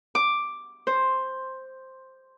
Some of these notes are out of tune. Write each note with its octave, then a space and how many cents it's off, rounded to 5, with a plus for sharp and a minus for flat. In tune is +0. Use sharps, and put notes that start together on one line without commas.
D6 +5
C5 +5